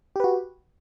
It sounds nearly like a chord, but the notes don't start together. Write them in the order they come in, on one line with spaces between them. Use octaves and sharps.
G4 B4 F#4